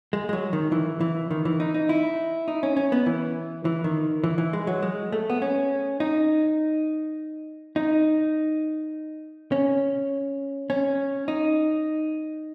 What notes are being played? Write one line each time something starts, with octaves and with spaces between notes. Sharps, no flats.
G#3
G#3
F#3
D#3
E3
E3
D#3
E3
D#4
D#4
E4
D#4
C#4
C#4
B3
E3
E3
D#3
E3
E3
G#3
F#3
G#3
A3
B3
C#4
D#4
D#4
C#4
C#4
D#4